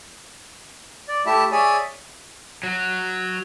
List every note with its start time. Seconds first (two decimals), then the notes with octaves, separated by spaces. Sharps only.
1.08 D5
1.26 A3 E4 G4 E5 A5
1.52 G#4 C#5 D5 E5 G#5
2.63 F#3